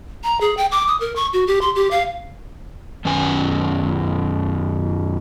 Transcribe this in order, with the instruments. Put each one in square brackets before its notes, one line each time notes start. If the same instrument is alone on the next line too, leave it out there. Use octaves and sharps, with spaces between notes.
[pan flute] A#5
G#4
G5
D6
D#6
A#4
C#6
F#4
G4
C6
G4
F5
[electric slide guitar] F#2 D#3 C#4 B4 G#5